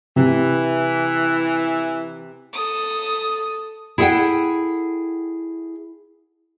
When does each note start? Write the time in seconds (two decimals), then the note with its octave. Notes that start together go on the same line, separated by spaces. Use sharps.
0.16 C3 E3
2.53 A4 D#6
3.98 E4 G#4 A4 C#5 F#5 G5